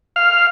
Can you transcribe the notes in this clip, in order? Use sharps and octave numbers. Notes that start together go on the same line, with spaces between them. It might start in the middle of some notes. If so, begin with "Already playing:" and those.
F5